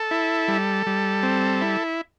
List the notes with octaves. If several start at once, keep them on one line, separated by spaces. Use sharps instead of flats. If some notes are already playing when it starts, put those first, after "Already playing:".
Already playing: A4
E4
G3
G3
C4
E4